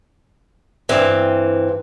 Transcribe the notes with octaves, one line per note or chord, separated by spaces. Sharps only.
G2 E3 C4